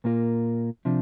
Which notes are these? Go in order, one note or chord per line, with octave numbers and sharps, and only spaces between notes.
A#2 A#3 F4 A#4
C3 F3 D4